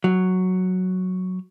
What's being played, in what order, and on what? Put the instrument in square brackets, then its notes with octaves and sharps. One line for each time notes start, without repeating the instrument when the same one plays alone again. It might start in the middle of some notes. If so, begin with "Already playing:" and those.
[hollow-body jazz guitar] F#3